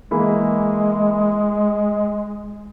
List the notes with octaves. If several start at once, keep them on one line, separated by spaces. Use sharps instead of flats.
E3 G#3 A#3 E4 G#4